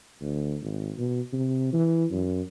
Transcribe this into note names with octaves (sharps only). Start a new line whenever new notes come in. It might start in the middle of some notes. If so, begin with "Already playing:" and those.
D2
G#1
B2
C3
E3
F#2